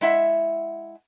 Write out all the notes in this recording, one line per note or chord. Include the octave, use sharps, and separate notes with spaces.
G#3 E4 E5 F#5